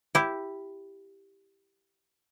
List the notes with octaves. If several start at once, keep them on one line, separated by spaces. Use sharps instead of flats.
E4 G4